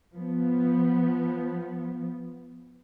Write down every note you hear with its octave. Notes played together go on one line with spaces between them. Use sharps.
F3 B3